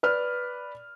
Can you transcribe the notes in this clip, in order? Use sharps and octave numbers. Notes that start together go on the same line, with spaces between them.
B4 D5 F6